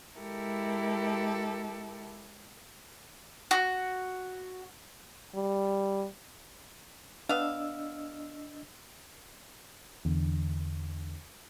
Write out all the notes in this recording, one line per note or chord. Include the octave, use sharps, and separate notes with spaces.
G#3 E4 G4 A4 A#4
F#4
G3
B3 D4 D#5 F5 E6
E2 D3